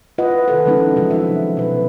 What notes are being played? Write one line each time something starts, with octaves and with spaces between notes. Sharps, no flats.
E4 F4 B4 D#5 F#5
C3 D#3 A4 B4
D3 F3 G#3 C#4 D#4 E4
C3 F3 F#3
D#4 E5
B2 B4